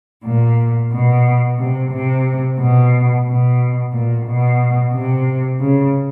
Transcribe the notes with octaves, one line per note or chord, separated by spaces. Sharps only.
A#2
B2
C3
C3
B2
B2
A#2
B2
C3
C#3